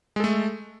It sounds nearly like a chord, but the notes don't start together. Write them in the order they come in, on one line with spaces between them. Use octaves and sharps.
G#3 A4 A3